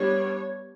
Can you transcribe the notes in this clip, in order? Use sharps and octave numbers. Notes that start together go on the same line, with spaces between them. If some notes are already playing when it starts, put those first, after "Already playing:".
Already playing: G3 B3 D4 C#5